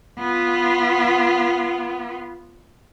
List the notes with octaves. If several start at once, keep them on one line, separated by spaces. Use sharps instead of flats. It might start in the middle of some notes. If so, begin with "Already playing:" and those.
B3 F4